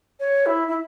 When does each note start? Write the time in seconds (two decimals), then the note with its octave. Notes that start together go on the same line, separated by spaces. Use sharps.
0.20 C#5
0.46 E4
0.68 E4